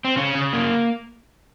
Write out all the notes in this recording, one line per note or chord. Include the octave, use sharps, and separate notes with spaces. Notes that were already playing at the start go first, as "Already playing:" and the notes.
C4
C#3 C#4
C#3
A#3